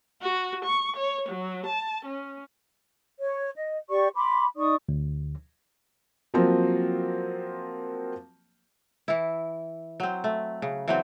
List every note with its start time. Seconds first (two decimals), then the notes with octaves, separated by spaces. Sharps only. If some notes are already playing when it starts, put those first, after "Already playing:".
0.22 F#4
0.65 C#6
0.96 C#5
1.29 F#3
1.66 A5
2.05 C#4
3.20 C#5
3.57 D#5
3.89 G4 D5 C#6
4.15 B5 C6 D6
4.57 D#4 D5 C#6 D#6
4.89 D2
6.34 F3 F#3 A#3 C4 F4
9.08 E3 E4
10.00 F#3 C4
10.24 A3
10.62 C#3
10.88 E3 F#3 C4